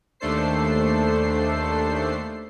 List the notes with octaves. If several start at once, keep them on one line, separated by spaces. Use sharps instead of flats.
D#2 A3 D4 A4 C5 C7